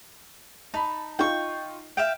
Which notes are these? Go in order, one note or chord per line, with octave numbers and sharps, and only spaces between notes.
D#4 A5 B5
D#4 F4 G5 C#6
E5 F5 G5 D7